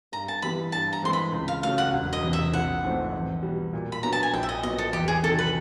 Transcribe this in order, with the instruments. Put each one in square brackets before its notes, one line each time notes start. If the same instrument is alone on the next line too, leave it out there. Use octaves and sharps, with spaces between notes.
[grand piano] G2 [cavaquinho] A#5
[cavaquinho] A5
[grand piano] E3 G3 B3 [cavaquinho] B5
[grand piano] G2 [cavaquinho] A5
[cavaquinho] A#5
[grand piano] E3 G#3 C4 [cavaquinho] C6
[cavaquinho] B5
[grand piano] C#2
[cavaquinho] F5
[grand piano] C#3 F#3 A3 [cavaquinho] F5
[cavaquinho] F#5
[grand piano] E1
[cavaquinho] D#5
[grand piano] E2 C3
[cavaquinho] E5
[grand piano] A#1 [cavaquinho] F#5
[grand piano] G#2 F3 A3 C4
E2
B2 G3
A#2
[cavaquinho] B5
[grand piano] F#3 B3 D4 [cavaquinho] A#5
[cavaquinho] A5
G#5
[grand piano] A#1 [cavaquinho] G5
[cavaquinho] E5
D#5
[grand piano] A#2 F#3 B3 [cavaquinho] D#5
[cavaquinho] A4
[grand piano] E2 [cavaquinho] G4
[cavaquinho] G#4
[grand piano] C3 D#3 F#3 [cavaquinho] A4
[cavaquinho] B4